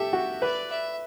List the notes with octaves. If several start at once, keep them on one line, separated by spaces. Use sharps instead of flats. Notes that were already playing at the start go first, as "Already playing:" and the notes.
Already playing: G4 A4 E5
F#4
B4 D5
E5